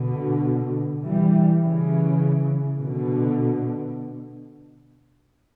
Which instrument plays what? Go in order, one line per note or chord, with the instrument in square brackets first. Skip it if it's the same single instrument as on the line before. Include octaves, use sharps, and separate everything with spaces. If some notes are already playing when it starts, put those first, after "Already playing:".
Already playing: [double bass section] B2 D3
E3 G3
C#3 E3
B2 D3